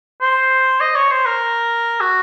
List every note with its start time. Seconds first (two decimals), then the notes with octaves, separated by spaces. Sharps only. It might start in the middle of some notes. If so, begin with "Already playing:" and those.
0.21 C5
0.81 D#5
0.96 C#5
1.11 C5
1.26 A#4
2.00 F#4